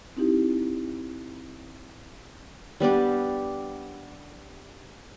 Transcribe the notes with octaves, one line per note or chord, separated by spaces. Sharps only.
C4 D#4 E4 G4
G3 B3 D4 G4